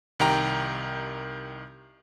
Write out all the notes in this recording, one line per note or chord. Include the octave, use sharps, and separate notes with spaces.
C2 D#3 G4 G5 A#5